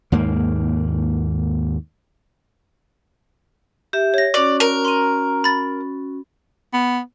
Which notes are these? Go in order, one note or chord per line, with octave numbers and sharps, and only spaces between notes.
D#2 G#2 A#3
G4 E5
C#5 A#6
C#4 F#4 D5
A#4
C6 D#7
B5 A6
B3